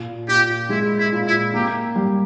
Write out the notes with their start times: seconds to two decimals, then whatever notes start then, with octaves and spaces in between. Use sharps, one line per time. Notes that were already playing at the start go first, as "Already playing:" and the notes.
Already playing: A#2
0.28 A#2 G4
0.69 G#3 E4
0.98 E4
1.12 A#2
1.26 E4
1.54 A#3 G4
1.96 G3